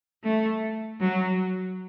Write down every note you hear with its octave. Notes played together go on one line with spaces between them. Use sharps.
A3
F#3